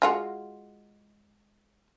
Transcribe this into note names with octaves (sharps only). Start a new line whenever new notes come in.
G#3 F4 F#4